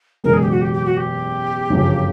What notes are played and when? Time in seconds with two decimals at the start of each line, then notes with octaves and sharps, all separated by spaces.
0.24 F#1 E2 B2 G#3 A#4
0.33 G#4
0.41 G4
0.51 F#4
0.61 G4
0.73 G4
0.85 F#4
0.97 G4
1.70 G1 F#2 C#3 F3